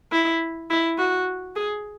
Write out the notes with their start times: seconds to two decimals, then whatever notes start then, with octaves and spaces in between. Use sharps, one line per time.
0.12 E4
0.70 E4
0.98 F#4
1.56 G#4